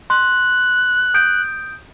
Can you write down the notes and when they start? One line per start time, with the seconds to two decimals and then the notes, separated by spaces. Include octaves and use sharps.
0.10 C6 F#6
1.14 D#6 G6 D7